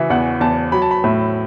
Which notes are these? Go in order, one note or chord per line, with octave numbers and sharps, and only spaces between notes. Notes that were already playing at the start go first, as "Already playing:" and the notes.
Already playing: C#3 E3 F#4 E5
E2 F#5
E2 A5
F#3 B5
A5
B5
A2 E5